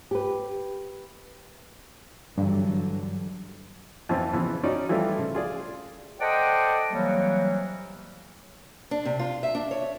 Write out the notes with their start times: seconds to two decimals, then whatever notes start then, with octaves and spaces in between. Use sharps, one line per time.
0.11 G4 B4
2.38 G2 D3 E3 F#3
4.09 F2 E3 C4 F4
4.33 C#3 E3 F3 B3
4.63 C#4 D#4 F4 F#4 D5
4.89 E3 F3 G3 A3 E4 F4
5.19 C#3
5.35 F4 G#4 D5
6.20 A4 C5 D5 D#5 F#5 G5
6.91 C3 E3 F#3 G3 A#3
8.91 D4
9.05 C3
9.19 F4
9.43 E5
9.55 D4
9.71 C#5